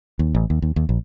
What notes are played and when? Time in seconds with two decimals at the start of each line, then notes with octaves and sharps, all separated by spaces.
0.19 D#2
0.35 A1
0.50 D#2
0.62 D#2
0.76 D#2
0.89 A#1